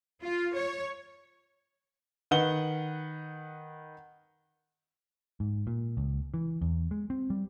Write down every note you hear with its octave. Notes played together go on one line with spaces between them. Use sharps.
F4
C#5
D#3 B4 F#5 G7
G#2
A#2
C#2
E3
E2
G#3
C4
G3